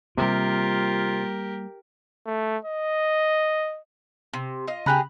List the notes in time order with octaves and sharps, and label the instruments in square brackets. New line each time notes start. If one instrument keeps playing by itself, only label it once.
[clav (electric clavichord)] C3 [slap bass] G3 A#3 [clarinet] F4 [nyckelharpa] G4 A#4
[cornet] A3
D#5
[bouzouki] C3
F4 D#5
[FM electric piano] C#3 B5 F#6 [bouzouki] G4 G#4 A#5